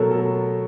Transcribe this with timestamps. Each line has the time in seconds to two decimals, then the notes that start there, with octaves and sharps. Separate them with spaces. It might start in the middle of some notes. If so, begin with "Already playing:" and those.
Already playing: B2 F#3 A3 A4 A#4
0.11 A4
0.17 A#4